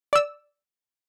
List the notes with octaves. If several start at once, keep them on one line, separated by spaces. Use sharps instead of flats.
D5 E6